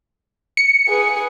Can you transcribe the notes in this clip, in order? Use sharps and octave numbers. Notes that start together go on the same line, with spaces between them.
C#7
G#4 B4